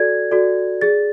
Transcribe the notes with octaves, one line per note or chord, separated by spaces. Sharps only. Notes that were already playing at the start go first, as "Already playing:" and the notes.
Already playing: F#4 A4 D5 G#6
F#4 A4 D5
G#4 D5 A6